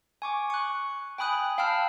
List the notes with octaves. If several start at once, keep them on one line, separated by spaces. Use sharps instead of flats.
G#5 C#6 D6
C#6 F#6
G5 G#5 B5 D#6 F#6
F5 G5 A5 B5 E6 F6